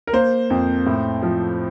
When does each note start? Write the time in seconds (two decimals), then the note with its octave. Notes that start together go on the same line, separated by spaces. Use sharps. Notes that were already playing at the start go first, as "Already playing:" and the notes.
0.07 A#4
0.13 A#3 C5
0.50 F2
0.86 A2
1.23 F3